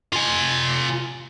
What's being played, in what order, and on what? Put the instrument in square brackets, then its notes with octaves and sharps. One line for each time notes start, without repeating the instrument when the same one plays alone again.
[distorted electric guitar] F4 G#5